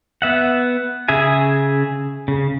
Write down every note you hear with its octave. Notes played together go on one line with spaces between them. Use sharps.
B3 E5 F#5
C#3 G#4 E5 G#5
C#3